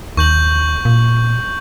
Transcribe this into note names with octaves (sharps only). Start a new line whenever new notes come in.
D#2 C#6 G6 F#7
A#2